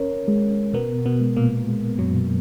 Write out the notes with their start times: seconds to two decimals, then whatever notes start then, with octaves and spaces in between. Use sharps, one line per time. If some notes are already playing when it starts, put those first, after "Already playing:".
Already playing: C#4 A#4 C#5
0.28 G#3
0.74 B2 B3 A#4
1.06 B2 B3
1.20 G#3
1.36 A#2 A#3
1.68 G#3
1.99 F#2 F#3
2.15 B2